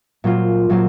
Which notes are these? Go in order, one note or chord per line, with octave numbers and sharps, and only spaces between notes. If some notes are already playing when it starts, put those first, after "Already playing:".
A#2 F#3 C4 F4
A#2 F#3 C4 F4